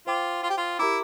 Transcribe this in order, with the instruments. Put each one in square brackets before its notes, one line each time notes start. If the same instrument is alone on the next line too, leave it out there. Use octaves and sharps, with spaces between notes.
[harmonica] F4 [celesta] C5 G5 D6
[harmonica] F4
G4
F4
[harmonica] E4 [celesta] G4 A#4 E5 A#5 D6